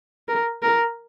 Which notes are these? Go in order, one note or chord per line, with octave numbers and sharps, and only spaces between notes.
A#4
A#4